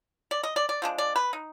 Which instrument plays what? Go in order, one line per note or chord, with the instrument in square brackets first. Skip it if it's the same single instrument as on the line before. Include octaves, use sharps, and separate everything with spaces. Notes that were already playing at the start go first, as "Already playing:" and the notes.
[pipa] D5
D#5
D5
D5
F3 G#3 D4
D5
B4
D#4